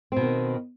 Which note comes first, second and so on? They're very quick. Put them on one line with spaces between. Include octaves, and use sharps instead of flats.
C4 B2 D#3